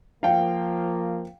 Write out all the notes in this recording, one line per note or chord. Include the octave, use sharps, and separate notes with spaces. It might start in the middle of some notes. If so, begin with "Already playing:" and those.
F3 A#3 F5 G5